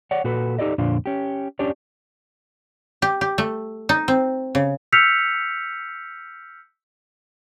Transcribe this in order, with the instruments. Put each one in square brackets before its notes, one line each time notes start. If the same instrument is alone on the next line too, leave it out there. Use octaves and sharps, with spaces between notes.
[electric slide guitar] C#5 D5 F#5
A#2 F#4 A4 B4
D#4 G4 A4 D5 D#5
F2 A#2 D3 D4 F4
C#4 G4
C#4 D4 G4 C#5 D5
[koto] G4
G4
A3
D#4
C4
C#3
[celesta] E6 F6 G6 B6 C#7 F7